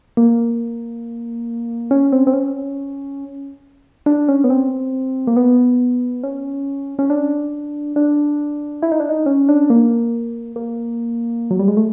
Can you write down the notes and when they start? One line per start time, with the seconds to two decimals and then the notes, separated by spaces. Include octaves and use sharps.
0.17 A#3
1.91 C#4
2.12 C4
2.27 C4
2.33 C#4
4.06 D4
4.29 C#4
4.44 B3
4.50 C4
5.27 A#3
5.37 B3
6.24 C#4
6.99 C#4
7.10 D4
7.96 D4
8.82 E4
8.92 D#4
9.00 D4
9.09 D#4
9.26 C#4
9.49 D4
9.70 A#3
10.56 A#3
11.51 F#3
11.59 G3
11.68 G#3
11.77 A3